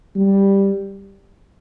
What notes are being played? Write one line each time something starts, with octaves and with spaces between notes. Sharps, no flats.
G3